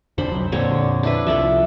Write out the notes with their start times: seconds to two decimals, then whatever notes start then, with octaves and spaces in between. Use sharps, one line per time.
0.18 F2 D3 D4 C5 B5
0.31 C2 F#3
0.52 F2 A#2 D3 C4 C#5
1.03 D4 E4 B4
1.27 C2 F3 A4 D5 E5